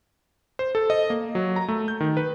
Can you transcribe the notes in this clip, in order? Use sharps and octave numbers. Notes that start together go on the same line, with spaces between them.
C5
A4
D#5
A#3
F#3
A#5
A3
G6
D#3
B4